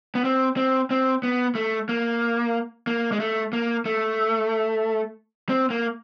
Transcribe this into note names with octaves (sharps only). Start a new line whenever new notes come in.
B3
C4
C4
C4
B3
A3
A#3
A#3
G#3
A3
A#3
A3
C4
A#3